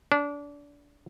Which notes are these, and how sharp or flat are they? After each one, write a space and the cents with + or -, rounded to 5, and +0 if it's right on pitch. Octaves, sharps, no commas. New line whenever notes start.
D4 -25